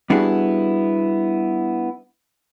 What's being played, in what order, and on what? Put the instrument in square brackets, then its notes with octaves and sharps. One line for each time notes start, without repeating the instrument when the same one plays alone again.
[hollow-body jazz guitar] G3 B3 D4 E4 F#4 G#4